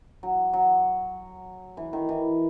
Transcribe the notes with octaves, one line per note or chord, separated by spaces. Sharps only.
F#3
F#3
E3
D#3
E3